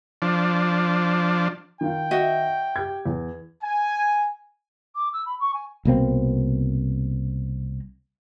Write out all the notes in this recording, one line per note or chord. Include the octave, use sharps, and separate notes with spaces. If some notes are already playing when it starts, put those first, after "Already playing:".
F3 D4
D#3 F4 G5
F#4 D#5 E5
G4 G#6
E2
G#5
D6
E6
B5
C#6
G#5
C2 B2 A#3 C4